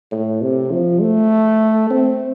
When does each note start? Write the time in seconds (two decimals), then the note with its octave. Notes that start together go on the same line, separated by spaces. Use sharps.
0.11 A2
0.41 C3
0.72 F3
1.01 A3
1.91 C4